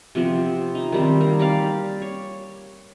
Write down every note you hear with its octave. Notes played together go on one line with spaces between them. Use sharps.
C3 F3 B3 C4
D#4
D#3 G3 C4
A#3
G4 D5 F5
C#5